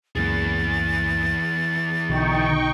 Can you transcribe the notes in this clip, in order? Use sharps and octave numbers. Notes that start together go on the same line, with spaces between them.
C#2 F#2 E3 A#3 G#4 A6
B1 B2 D3 D#4 G5 C#6